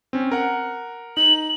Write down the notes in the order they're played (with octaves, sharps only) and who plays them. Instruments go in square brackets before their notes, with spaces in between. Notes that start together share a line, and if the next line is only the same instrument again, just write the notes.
[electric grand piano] C4 C#4
A#4 F#5
[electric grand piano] D#4 [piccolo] F#7